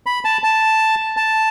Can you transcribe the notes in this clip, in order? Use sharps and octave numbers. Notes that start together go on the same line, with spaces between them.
B5
A5
A5
A5